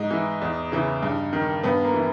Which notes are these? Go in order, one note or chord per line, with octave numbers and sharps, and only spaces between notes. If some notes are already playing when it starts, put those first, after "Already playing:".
Already playing: G#2 D#4
E3
E2
C#3 E3
G2
D#3
G2 B3
A#3
E3